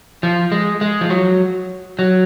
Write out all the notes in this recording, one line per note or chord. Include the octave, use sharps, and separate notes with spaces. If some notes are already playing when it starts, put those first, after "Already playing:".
F3
G#3
G#3
F3
F#3
F#3